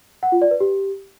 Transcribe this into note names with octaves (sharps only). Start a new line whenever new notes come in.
F#5
F4
D5
B4
G4